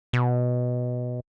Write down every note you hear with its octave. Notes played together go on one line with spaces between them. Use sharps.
B2